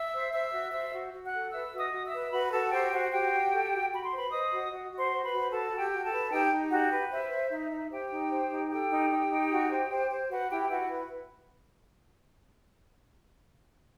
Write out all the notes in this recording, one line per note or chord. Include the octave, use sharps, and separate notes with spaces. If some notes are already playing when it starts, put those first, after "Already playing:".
Already playing: E5 E6
C5
C5 E5 E6
F#4
C5 E5 E6
F#4
F#4
F#5 F#6
A4
B4 E5 E6
F#4
D#5 D#6
F#4
E5 E6
B4
F#4 B4 B5
B5
F#4 A4 A5
G4 C5 G5
F#4 C5 F#5
F#4 G4 G5
F#4
A4
F#4
F#4 B5
C6
B4 C5 B5
C5 D#5 D#6
F#4
F#4
F#4
C5 C6
C5
B4 B5
F#4
F#4 A4 A5
F#4
G4 G5
F#4
A4 A5
B4
D#4 G4 G5
D#4
F#4 G4 F#5
B4
C5 E5
C5
D#4 E5
D#4
G4 C5 G5
D#4
C5
D#4
G4 A4 G5
D#4
D#4
D#4
F#4
C5
C5
C5
F#4 B4 F#5
E4 G4 G5
E4 F#4 F#5
B4